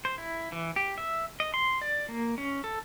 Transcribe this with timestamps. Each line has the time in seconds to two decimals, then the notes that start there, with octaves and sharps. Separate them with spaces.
0.05 C5
0.18 E4
0.52 E3
0.76 G4
0.98 E5
1.40 D#5
1.54 C6
1.82 D5
2.09 A#3
2.38 C#4
2.64 A4